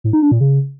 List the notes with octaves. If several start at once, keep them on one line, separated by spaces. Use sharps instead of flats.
A2
D#4
D4
A#2
C#3